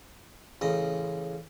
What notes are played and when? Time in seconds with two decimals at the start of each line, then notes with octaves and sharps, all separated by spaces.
0.61 A1 C#3 D#5